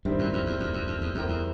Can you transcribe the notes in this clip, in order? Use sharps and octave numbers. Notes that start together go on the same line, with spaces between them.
G2 D#3 G3 C4 E4
F#2
F2
E2
F2
F2
F2
E2
F2 G3 C4 E4 G4 A#4
E2